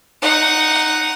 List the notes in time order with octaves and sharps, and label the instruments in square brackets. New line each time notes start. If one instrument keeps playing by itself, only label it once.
[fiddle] D#4 F#5